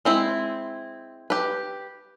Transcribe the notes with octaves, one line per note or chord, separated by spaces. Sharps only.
G#3 C4 E4
G4 B4